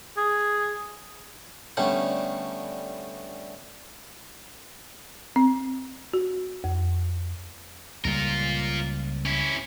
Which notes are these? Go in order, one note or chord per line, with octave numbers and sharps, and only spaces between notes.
G#4
D3 G3 A3 B3 C#4 A4
C4
F#4
F2
C#2 G3 A#3 F4 A#4
C#4 E4